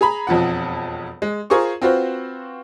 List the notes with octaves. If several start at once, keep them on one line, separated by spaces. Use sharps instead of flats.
G#4 A#5 B5
E1 F2 F3 F#5
G#3
F4 G#4 A#4 C5 C#6
C4 F4 F#4 B4 C5